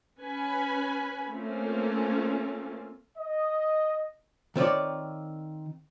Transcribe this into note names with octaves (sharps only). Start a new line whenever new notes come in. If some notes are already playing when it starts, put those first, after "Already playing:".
C#4 B4 G#5 B5
A3 A#3 C4 C#4 F4
D#5
D#3 C4 F4 C#5 D5